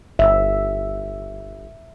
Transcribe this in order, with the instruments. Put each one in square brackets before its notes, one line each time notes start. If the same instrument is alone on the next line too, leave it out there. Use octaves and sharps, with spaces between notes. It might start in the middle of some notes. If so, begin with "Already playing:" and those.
[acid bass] G1 [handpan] E5